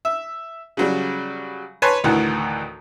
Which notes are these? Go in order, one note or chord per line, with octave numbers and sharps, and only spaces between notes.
E5
C#3 F#3 G3
B4 C#5 G#5 A5 C6
D2 A2 D#3 E3 F#5